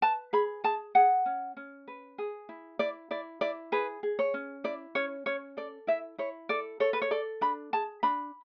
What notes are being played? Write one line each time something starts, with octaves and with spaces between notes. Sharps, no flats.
B4 A5
G#4 B5
G#4 A5
G#4 F#5
C#4
C#4
B4
G#4
E4
E4 D5
E4 D5
E4 D5
G#4 B4
G#4
C#5
C#4
E4 D5
C#4 C#5
C#4 C#5
A4 D5
E4 E5
E4 C#5
A4 D5
A4 C#5
B4
C#5
A4 D5
D4 B5
G#4 A5
D4 B5